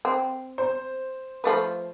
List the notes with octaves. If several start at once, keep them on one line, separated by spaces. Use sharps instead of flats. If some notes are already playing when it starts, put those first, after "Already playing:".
C4
C5
F3 A3 B4